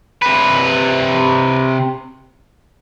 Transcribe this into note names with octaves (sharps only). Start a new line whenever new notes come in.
C3 B4